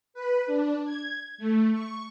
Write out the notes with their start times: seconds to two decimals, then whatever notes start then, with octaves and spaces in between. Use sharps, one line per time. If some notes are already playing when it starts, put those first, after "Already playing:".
0.14 B4
0.47 D4
0.85 G#6
1.38 A3
1.72 C#6